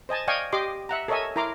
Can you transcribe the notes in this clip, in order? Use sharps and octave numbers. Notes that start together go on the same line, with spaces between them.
C5 D#5 G#5 A5
D5 D#5 F5 G5 G#5 C#6
G4 D#5 C6 D6
E5 F#5 A#5
A4 A#4 C#5 D#5 E5 G#5
E4 A#4 A#5 C6 D6